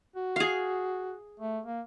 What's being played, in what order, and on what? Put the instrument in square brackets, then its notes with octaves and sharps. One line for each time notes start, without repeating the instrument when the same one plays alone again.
[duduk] F#4
[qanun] G#4 F5
[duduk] A3
A#3